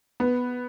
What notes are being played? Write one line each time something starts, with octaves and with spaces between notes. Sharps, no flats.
B3